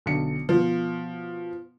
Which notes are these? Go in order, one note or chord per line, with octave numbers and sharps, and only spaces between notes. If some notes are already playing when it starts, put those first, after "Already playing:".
B1 D3 C#7
B2 F3